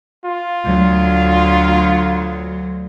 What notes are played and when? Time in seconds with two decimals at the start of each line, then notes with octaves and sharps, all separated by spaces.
0.25 F4
0.65 D2 F#3